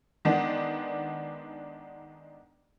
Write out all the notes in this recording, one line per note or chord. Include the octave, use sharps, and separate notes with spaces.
D#3 G#3 B3 D4